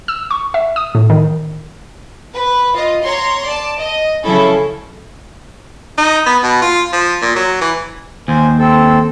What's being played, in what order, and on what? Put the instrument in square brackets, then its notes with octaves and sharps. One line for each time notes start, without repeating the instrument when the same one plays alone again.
[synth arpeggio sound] E6
C#6
E5
D#6
A2
D#3
[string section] B4
F4 D#5
C#5 A#5 C6
D5 A5
D#5
C#3 F#3 C#4 E4 A4
[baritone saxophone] D#4
B3
B2
F4
F3
A#2
F#3
E3
[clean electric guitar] D#2 [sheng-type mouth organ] C5 G#5
[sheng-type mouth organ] C4 A4